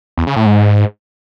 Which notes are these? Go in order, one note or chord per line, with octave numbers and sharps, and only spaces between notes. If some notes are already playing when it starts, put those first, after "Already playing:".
E2
C#3
A2
G#2